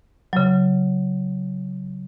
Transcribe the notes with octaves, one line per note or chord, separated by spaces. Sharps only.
C#3 F#3